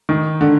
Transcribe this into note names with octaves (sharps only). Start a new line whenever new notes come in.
D#3
D3